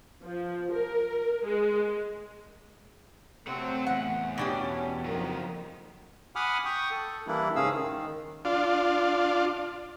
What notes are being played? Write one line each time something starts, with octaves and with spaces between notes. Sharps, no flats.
F3
A#4
G#3
C3 A3 C4 C#5 F#5
E2 A2 F#5
B2 C#4 D4 G4
F2 D#3 F#3 A#3
F#5 G#5 B5 D6 D#6 F6
G5 C#6 D#6
A4
E3 G3 A#3 D4 E4
G#2 C#3 C#4 G#4 F5 E6
D#3
D4 F4